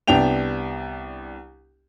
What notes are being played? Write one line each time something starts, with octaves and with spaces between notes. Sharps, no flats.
C2 B3 D4 G5 F7